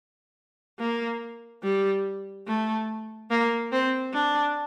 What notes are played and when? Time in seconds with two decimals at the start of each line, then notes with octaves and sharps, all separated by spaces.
0.79 A#3
1.63 G3
2.47 A3
3.31 A#3
3.72 C4
4.14 D4